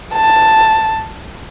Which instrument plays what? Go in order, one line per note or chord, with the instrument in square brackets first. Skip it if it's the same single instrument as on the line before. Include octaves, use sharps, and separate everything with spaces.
[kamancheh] A5